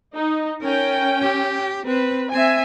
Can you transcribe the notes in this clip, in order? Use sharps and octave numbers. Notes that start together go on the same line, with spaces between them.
D#4
C#4 A#4 G5
G4
C4 B4
C4 E5 G#5